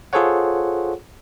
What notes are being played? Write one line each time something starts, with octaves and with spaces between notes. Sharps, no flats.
F4 G#4 A4 C5 C#5 F#5